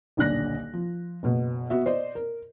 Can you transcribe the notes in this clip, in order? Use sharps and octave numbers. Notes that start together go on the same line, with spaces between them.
D#1 B1 D3 D5 F#6 A#6
F3
F#1 B2
B3 F#4 E5
C5 D5 D#5
A#4